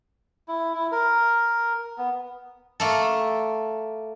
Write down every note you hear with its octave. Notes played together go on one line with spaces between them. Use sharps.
E4
E4
A#4
B3
A3 A#3 A4